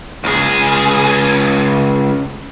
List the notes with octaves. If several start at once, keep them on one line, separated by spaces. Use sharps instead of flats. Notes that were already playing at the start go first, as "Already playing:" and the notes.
C#2 G#4